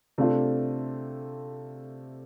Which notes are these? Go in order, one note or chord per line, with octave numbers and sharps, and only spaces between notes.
C3 A3 D4 F4 A4